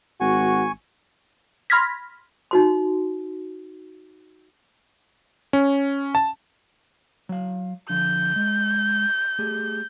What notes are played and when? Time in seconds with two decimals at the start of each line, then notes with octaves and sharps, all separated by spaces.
0.21 G#1 F#4 G#5 C#6
1.70 B5 C6 F6 G#6 A#6 B6
2.51 D#4 F#4 C6
5.53 C#4
6.15 A5
7.29 F#3 F5
7.90 D3 F3 G6
8.36 G#3
9.39 A3 G4 G#4